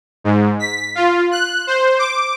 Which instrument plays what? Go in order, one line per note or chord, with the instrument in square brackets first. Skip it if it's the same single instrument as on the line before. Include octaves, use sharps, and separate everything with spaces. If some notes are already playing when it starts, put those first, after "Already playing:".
[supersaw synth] G#2
B6
F4
F#6
C5
D6